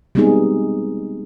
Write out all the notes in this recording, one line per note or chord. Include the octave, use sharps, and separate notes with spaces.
G3 G#3 B3 C4 D#4 G#4